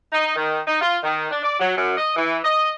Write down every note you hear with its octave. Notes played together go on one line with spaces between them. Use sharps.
D#4
D#3
D#4
F4
D#3
D4
D5
F#3
F#2
D#5
E3
D#5